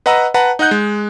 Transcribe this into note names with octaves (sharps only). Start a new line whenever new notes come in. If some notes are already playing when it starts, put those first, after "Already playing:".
B4 D#5 F#5 A#5 B5 E6
B4 F#5 A5 A#5
D#4 D#5 F#5 F#6 G6
G#3